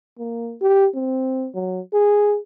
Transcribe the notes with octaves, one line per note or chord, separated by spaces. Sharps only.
A#3
G4
C4
F#3
G#4